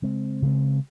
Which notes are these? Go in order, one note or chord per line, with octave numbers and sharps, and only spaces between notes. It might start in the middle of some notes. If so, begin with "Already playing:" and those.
C#3 G#3 C4
C#3 G#3 C4